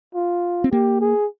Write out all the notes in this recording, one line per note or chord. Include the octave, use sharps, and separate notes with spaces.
F4
C4
A#3 G4
G#4